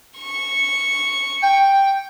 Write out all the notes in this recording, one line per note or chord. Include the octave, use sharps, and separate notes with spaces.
C#6
G5